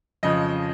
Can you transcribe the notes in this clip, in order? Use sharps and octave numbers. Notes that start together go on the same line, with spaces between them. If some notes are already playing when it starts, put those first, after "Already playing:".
F2 C#3 F3 D#5